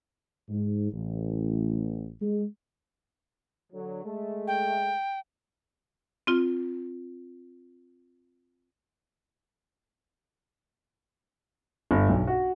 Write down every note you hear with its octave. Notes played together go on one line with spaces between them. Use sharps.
G#2
A1
G#3
D3 F#3
G#3 A3
G5
C4 F4
G1
B1
F#4